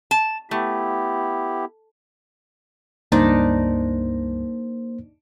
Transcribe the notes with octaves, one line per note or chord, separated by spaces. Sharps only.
A5
A3 B3 E4 G4
C#2 G2 A#3 D4 D#4 C5 D5